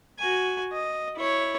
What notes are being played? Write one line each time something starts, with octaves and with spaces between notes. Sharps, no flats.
F#4 G#5
D#5
E4 C#5